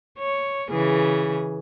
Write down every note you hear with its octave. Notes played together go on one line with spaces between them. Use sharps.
C#5
C#3 E3 G#4